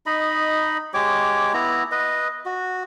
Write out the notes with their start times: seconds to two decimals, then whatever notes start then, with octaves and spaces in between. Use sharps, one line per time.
0.06 D#4 D#5 B5
0.94 G#3 G4 C#5 D6
1.54 B3 E4 A#5
1.91 B4 D#5
2.46 F#4